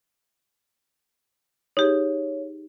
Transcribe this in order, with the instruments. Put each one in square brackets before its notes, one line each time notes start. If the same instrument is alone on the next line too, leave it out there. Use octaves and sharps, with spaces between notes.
[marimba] D#4 G4 G#4 [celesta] C#5